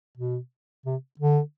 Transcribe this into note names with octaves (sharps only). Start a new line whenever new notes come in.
B2
C3
D3